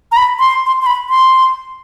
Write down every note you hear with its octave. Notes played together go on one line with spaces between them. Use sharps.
A#5
B5
C6
C6
C6
B5
C6